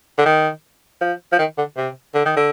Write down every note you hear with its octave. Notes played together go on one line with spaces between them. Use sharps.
D3
D#3
F3
F3
D#3
D3
C3
D3
D#3
D3